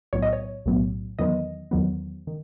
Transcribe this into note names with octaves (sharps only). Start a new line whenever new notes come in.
B1 A2 F#3 B3 C#5
D#5
C#5
B1 A2 F#3 B3
E2 D#3 F#3 B3 D#5
E2 D#3 F#3 B3
D#3